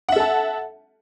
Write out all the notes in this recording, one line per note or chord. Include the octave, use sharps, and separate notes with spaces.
A4 E5 F#5 A5